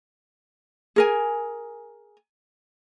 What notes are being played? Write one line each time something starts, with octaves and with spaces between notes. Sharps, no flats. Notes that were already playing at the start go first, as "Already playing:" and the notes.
G#4 A#4 G#5